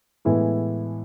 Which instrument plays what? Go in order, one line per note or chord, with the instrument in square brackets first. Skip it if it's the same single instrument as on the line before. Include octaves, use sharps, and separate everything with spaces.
[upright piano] A2 E3 G#3 B3 E4